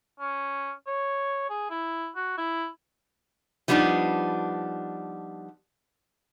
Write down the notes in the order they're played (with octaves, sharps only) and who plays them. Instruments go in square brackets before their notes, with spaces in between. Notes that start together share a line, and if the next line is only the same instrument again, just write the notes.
[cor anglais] C#4
C#5
G#4
E4
F#4
E4
[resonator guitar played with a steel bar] F3 G3 B3 D4 D#4